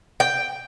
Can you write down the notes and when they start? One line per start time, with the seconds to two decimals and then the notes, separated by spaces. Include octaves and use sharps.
0.20 G5